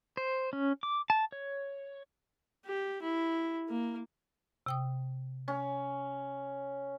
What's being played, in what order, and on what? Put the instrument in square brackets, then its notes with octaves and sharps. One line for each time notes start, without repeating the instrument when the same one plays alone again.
[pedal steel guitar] C5
C#4
D6
A5
C#5
[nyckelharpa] G4
E4
A#3
[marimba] C3 G5 D#6
[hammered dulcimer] C#4